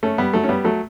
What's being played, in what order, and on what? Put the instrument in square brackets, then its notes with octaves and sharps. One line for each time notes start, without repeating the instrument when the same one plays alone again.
[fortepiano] A3 C#4
G3 B3
F#3 A3
C#4
G3 B3
F#3 A3